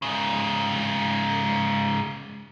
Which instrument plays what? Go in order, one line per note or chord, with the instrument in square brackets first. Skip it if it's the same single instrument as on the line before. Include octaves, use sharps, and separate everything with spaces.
[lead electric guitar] G#2 C#3